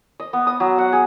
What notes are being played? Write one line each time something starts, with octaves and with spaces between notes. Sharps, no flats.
D#5
B3
D#6
F#3
F#5
G#4